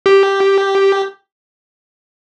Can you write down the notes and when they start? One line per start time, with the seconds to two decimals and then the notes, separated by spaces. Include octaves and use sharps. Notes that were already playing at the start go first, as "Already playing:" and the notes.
0.06 G4